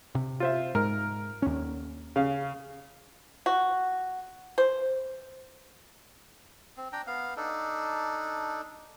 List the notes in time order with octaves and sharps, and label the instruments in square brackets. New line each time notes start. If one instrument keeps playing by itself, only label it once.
[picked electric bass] C3
[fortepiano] F4 C5 E5
[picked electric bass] G#2 [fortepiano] A#4
[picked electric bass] D#2 C#4
[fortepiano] C#3 F5
[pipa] F#4
C5
[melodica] C4
D4 G5 A#5
B3 F5
D4 D#4 A4